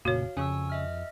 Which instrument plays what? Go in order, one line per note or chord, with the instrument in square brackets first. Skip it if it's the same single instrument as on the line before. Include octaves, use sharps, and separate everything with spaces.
[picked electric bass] F1 C#3 [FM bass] A#2 [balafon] F#4 C#5 [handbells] F5
[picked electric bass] F2 [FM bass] C#3 [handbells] G#5 C#6 E6
[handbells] D#5 E5 F6